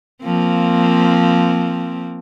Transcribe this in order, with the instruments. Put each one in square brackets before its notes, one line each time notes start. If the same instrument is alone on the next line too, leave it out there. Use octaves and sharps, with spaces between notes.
[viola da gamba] F3 A#3 C4